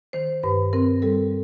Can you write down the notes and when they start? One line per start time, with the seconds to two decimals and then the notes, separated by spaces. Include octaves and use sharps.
0.13 D#3 C5
0.43 G2 B4
0.73 C4 A#4
1.02 G3 A4